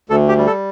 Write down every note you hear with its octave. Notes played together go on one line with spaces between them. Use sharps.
D2 A4
G4
G3
A4